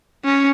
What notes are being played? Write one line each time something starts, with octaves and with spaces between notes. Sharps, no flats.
C#4